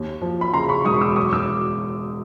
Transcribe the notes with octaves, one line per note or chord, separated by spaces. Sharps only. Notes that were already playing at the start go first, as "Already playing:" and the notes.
Already playing: D#2
F3
B5
C#3 A#5 C6
B5 C#6
E1 C#6 D#6
D6 E6
F#2 C#6 D#6
D6 E6